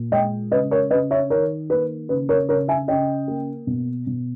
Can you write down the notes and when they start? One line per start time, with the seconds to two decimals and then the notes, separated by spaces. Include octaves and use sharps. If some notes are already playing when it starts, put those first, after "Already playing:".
Already playing: A#2
0.12 G#3 D#5 G5
0.51 C#3 B4 D#5
0.71 A#4 C#5
0.91 C#3 B4 D#5
1.11 C#5 E5
1.30 D#3 A#4 C#5
1.70 A#3 B4
2.09 C#3 B4
2.29 A#4 C#5
2.49 C#3 A#4 C#5
2.68 E5 G#5
2.88 C#3 D#5 G5
3.28 A#3
3.67 B2
4.07 B2